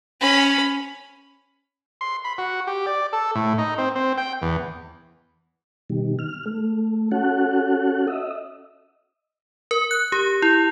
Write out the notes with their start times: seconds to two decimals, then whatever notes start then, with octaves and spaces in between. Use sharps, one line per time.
0.21 C#4 B5
2.01 C6
2.25 B5
2.38 F#4
2.67 G4
2.86 D5
3.13 A4
3.35 A2
3.58 D#4
3.78 C4
3.95 C4
4.18 G5
4.42 E2
5.90 B2 D#3 G3
6.19 F6
6.46 A3
7.12 C#4 F#4 A4 F#5
8.07 D#5 E5
9.71 A#4
9.91 F#6
10.12 G4
10.42 E4